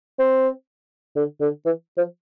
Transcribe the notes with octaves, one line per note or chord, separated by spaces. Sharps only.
C4
D3
D3
E3
F3